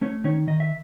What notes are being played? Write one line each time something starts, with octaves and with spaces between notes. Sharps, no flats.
A3 C#4 C#5
D#3 C#4 C#5
D#3 D#5
E5